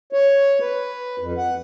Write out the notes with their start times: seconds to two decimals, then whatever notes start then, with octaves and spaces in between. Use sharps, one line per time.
0.13 C#5
0.61 B4
1.19 F2
1.38 F#5